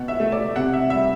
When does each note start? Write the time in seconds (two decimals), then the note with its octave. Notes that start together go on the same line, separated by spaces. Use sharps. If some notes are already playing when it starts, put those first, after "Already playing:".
Already playing: B2 F#5
0.08 E5
0.20 A3
0.32 D5
0.55 C3 F#5
0.73 E5
0.90 G3 E5